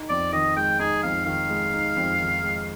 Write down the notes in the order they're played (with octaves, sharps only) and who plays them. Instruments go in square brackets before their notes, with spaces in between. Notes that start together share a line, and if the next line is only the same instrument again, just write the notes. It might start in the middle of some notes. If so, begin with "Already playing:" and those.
Already playing: [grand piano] D#4
[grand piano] F2 [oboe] D5
[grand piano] D#3 [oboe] D#5
[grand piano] G#3 [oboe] G5
[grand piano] D#4 [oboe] G#4
[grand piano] F2 [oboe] F5
[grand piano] D#3 [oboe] F5
[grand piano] G#3
D#4
F2
D#3
G#3